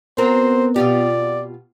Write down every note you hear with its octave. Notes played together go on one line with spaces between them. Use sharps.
B3 C4 F#4 A#4 C5
B2 F4 G4 D5